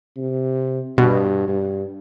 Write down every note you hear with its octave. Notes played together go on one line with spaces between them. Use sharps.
C3
G2 B2
G2